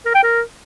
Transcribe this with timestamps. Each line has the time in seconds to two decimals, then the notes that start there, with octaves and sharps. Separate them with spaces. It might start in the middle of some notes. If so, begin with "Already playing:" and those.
0.05 A#4
0.14 G5
0.23 A#4